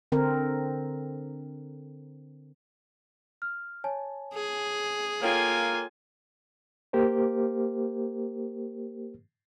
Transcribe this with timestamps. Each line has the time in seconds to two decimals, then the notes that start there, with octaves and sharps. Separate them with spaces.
0.12 D3 C4 A#4
3.42 F6
3.84 C#5 G#5 A5
4.34 G#4
5.21 A#3 F4 A4 C#5 G5 G#5
6.93 A#3 G4 A#4 C5